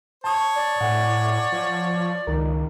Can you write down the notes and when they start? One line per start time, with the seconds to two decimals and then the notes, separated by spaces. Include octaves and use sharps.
0.24 C#5 A5 D#6
0.55 D5
0.81 A2 F#5 G#5
1.52 F3
2.27 C#2 D#3 A#4